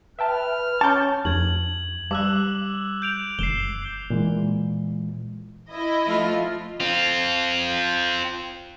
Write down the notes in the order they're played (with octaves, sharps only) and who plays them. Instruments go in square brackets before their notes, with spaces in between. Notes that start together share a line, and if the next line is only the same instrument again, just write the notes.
[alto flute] B4 [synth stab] E5 G5 A5 [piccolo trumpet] F6
[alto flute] C#4 [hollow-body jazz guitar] A5 [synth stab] C#6 D6 G6
[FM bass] F2 [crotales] G#6 F#7
[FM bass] G3 [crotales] D6 E6 F#6
[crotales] G6 D7 F7
[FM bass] F#1 [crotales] C7 E7 G7
[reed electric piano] A#2 E3 G#3
[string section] E4 D#5
[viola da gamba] F3 A3 F4
[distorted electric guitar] C4 F4